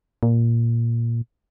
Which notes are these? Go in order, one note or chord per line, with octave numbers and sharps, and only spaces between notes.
A#2